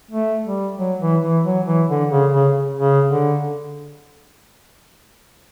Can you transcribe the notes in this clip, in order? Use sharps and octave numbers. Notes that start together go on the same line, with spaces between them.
A3
G3
F#3
E3
E3
F#3
E3
D3
C#3
C#3
C#3
D3